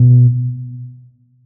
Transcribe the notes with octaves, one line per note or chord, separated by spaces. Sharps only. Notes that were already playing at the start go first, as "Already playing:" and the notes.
Already playing: B2